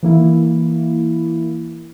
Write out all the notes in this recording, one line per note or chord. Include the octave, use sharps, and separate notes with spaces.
E3 A#3 E4